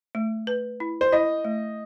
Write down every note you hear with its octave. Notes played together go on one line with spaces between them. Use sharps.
A3
B4
E4
C5
E4 D#5
A3